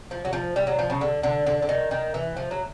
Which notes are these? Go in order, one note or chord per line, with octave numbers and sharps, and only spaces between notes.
F3
F#3
F3
G3
F#3
F3
C#3
D3
D3
D3
D3
D#3
D#3
E3
F3
F#3